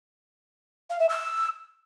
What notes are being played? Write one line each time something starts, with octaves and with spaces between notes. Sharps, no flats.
F5
E5
E6